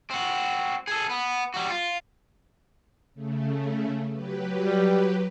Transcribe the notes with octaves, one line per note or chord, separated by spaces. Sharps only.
C4 F#4
G#4 A4
B3
G3 F#4
F4
C#3 A3
F#3 G4 B4
G3